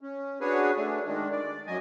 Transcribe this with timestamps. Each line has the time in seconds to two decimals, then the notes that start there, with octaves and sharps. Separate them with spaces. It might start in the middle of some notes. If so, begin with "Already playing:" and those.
0.01 C#4
0.41 D4 F#4 G#4 B4 C#5 G#5
0.77 A3 D4
1.06 D#3 G#3 D4
1.32 D5
1.67 F#2 F#3 D#5 G#5